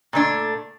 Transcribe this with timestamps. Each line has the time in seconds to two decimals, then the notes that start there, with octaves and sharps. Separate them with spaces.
0.13 A#2 A3 D4